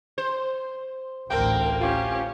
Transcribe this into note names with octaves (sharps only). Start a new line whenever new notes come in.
C5
A1 D2 A2 A#3 C4 A#4 G5
C#4 F4 G4